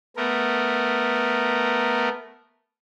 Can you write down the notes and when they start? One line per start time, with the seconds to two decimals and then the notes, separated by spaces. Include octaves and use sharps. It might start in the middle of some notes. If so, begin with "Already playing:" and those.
0.17 A3 B3 A#4